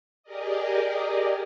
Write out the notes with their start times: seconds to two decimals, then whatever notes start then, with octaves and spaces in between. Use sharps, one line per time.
0.23 G4 G#4 A#4 D5 D#5